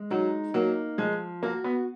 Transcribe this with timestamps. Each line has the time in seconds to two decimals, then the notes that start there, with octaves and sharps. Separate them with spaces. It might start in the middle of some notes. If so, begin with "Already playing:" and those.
Already playing: G#3
0.10 F#3 D#4
0.54 F#3 A#3
0.98 F3 G#3
1.43 A#3 F#4
1.64 B3